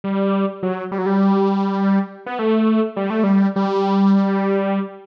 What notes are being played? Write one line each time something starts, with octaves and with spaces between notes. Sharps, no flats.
G3
F#3
G3
F#3
G3
B3
A3
G3
A3
G3
G3